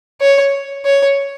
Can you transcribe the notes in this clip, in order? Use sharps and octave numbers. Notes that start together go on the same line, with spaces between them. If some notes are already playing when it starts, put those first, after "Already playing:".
C#5
C#5